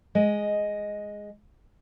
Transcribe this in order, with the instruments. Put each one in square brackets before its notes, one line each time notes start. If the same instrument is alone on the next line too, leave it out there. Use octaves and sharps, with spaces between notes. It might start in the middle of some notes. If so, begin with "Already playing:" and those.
[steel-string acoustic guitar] G#3 D#5